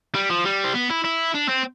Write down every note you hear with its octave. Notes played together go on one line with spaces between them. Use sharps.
G3
F3
G3
C4
B3
E4
E4
D4
C4